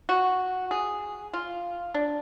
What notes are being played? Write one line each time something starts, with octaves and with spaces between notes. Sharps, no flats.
F#4
G#4
F4
D4